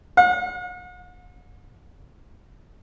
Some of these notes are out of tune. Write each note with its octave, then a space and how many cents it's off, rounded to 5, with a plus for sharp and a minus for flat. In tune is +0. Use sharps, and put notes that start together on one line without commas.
F#5 -45